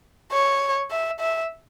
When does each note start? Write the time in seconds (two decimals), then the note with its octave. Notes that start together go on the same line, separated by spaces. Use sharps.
0.32 C#5
0.91 E5
1.20 E5